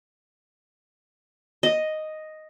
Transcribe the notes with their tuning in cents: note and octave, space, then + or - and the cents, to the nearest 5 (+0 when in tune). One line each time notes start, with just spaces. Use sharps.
D#5 +0